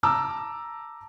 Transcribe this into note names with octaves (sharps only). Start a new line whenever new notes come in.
A5 A#5 D6 E6